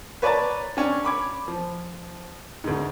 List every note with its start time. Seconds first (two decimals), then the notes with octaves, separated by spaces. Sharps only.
0.22 B4 C#5 D5 A5 A#5 A6
0.77 C#4 D4
1.05 B5 D6 G#6
1.48 F3
2.64 D2 G#2